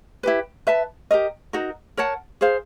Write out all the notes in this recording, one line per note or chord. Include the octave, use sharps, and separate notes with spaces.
E4 G4 B4
B4 E5 A5
G4 A#4 D#5
D#4 F#4 A#4
A#4 C#5 F#5 A5
G#4 C5 F5